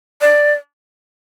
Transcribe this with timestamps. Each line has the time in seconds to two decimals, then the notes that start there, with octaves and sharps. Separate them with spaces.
0.21 D5